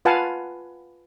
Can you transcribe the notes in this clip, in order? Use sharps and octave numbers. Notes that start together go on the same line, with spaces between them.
F4 B4 F5 F#5 G#5 A5